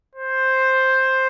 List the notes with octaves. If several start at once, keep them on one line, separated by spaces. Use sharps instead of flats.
C5